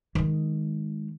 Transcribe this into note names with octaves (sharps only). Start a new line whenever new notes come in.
D#3 G#3